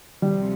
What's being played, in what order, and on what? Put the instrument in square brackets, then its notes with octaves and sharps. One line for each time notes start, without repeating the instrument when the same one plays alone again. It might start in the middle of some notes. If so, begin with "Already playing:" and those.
[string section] D2 C3 F3 [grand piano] G3